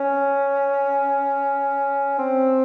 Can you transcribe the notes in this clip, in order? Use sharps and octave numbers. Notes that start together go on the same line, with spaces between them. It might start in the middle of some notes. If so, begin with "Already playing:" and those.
Already playing: C#4
C4